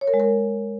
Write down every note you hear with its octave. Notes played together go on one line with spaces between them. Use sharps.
C#5
A#4
G#3
A#4